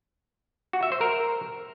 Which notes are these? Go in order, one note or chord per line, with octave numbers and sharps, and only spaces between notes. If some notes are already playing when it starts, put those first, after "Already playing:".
F#4
E5
C5
A#4